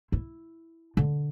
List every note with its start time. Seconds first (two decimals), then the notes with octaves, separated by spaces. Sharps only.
0.12 E4
0.97 D3